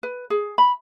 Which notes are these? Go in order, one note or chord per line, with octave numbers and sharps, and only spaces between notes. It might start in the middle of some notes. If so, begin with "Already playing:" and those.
B4
G#4
B5